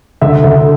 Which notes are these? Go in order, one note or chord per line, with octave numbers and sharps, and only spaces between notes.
D2 E5
D2